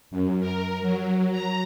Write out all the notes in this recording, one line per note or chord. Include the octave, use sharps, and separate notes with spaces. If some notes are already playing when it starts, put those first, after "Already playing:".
F#2
A#4
F#3
A#5